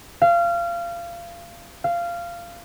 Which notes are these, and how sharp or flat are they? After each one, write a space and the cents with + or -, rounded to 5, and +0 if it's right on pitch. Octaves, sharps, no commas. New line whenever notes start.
F5 -25
F5 -15